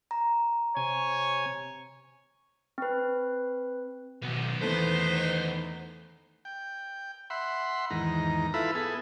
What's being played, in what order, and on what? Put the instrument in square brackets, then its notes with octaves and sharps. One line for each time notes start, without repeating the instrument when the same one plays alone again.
[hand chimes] A#5
[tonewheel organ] C3 G#5 [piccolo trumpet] C#5
[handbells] C4 B4
[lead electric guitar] B1 [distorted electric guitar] D#3 B3
[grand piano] E2 E3 A3 [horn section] D#4 B4 [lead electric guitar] C5
[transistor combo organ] G5
E5 F#5 B5 C6
E2 G#2 D#3 A#5
E4 F4 A4 B4 E5 B5
B3 G#4 A4